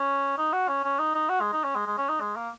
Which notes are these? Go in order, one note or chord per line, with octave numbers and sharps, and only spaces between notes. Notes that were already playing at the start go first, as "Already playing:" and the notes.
Already playing: C#4
D#4
F#4
C#4
C#4
D#4
D#4
F#4
G#3
D#4
C#4
G#3
G#3
C#4
D#4
G#3
A#3